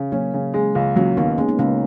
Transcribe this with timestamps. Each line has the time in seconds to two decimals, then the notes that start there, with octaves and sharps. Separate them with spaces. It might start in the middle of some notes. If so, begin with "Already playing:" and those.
Already playing: C#3
0.12 F#3 A#3 C#4
0.34 C#3
0.54 G#3
0.75 C#2
0.96 F#3 A#3 C#4
1.17 D#2 B3 D#4
1.38 G#3 A#3 C#4
1.48 B3 D#4
1.58 C#2 A#3 C#4